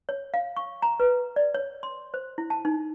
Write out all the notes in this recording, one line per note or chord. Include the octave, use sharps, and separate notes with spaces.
C#5
F5
C#6
A#5
B4
D5
C#5
C6
C5
E4
A5
D#4